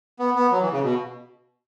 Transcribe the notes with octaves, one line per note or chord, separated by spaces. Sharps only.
B3
B3
F#3
E3
C#3
B2